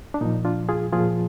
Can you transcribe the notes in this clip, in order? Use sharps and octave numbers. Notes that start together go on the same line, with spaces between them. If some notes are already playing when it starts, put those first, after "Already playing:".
D4
A#2 F3 D#4
D4 F4
F4 G#4
A#2 F3 F4 G#4